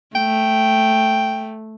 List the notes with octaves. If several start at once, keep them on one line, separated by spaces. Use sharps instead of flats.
A3 G5